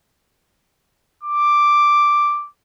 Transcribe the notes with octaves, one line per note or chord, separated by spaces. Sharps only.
D6